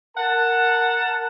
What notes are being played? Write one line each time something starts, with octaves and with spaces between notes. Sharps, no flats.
A#4 F#5 A5